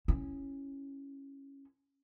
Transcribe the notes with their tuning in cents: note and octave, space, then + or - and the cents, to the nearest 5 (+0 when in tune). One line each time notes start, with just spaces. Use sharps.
C#4 -10 E4 +0